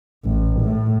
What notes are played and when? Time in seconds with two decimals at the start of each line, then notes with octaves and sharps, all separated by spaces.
0.25 A1
0.60 A2